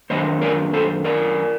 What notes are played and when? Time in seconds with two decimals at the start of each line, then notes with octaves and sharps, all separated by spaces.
0.10 F#2 D#3 A3 D4 C5 D#5
0.41 A#4 D5
0.74 A4 C5
1.04 A#4 D5